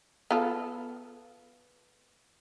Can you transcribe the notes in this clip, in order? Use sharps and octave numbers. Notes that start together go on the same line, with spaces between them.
B3 F4 A4